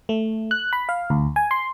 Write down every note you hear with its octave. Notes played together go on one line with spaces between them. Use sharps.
A3
F#6
B5
F5
D2
G#5
C6